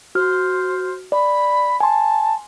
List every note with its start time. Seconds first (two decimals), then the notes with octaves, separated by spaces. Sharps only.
0.15 F#4 C5 F6
1.12 D5 B5
1.80 G#5 A5 C6